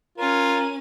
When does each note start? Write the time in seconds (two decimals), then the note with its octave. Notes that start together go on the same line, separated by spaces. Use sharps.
0.18 C#4 F4 A#4 D#7